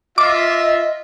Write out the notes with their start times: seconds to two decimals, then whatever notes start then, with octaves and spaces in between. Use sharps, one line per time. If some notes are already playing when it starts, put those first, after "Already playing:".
0.18 F4 D#5 E5 D6